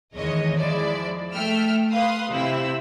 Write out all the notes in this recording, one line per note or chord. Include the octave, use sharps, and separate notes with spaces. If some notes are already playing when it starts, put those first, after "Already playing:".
E2 D#3 E3 G#3 C#5 D#5
F3 G#3 E4 D5
A3 G5 E6 F6
B4 F5 C6 D#6
C3 C4 E4 E6